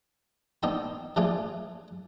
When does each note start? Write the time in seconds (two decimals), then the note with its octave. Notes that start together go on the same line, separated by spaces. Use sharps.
0.63 B3 D4 D#4 D#5 G5 C6
1.16 F3 A3 D4 F4 G#4